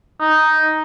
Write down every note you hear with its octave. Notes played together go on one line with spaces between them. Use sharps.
D#4